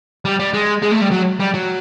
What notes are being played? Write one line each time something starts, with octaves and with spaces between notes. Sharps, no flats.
G3
G3
G#3
G#3
A3
G3
F#3
G3
F#3